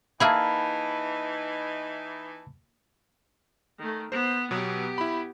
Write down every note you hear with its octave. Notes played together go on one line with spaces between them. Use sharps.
E3 A#3 D#4 E4 G#4 A5 B5
D#3 A3
B3 C5
B2 F#3 B3 G4
E4 B5